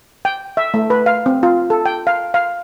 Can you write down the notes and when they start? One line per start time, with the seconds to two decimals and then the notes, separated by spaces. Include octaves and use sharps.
0.25 G5
0.57 E5
0.74 A3
0.90 B4
1.06 F5
1.26 C4
1.43 F4
1.70 A4
1.86 G5
2.07 F5
2.34 F5